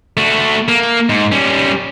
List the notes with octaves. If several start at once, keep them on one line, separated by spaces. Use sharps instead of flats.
A3 F#4
A#3
G#2
G3 C#4